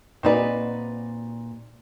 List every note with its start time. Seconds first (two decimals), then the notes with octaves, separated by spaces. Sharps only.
0.23 A#2 C4 D#4 F#4 B4 D5